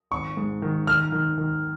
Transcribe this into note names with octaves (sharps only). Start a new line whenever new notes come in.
G#1 C#6
G#2
D#3
D#3 F6
D#3
D#3